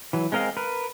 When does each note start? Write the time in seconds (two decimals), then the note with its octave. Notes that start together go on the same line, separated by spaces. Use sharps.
0.13 E3 F#3
0.32 G#3 C4 A#4 D#5 F5
0.57 A#4 B4